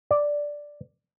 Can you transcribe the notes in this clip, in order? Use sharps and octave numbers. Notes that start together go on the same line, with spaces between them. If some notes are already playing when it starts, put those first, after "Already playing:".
D5